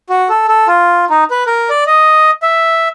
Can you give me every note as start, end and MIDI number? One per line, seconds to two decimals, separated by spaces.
0.09 0.28 66
0.29 0.47 69
0.48 0.67 69
0.68 1.05 65
1.10 1.24 63
1.31 1.44 71
1.47 1.69 70
1.70 1.84 74
1.87 2.31 75
2.42 2.88 76